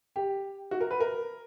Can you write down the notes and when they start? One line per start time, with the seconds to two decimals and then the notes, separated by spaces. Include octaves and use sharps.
0.16 G4
0.71 F#4
0.81 A#4
0.91 B4
1.00 A#4